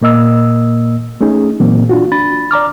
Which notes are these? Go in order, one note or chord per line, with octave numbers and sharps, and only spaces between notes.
A#2 A#3 D#5 E6
A3 C#4 D#4 G#4
A#2 E3 F#3 A#3 C4
D4 F4 F#4
D4 B5 A6
D5 A#5 D6 F6